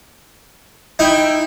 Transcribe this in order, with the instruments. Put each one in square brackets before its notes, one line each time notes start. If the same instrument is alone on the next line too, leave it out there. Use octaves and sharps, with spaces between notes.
[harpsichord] D#4 [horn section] E4 G5